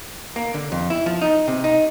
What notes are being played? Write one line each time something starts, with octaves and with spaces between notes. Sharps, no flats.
A#3
D3
F2
E4
F3
D#4
C3
D#4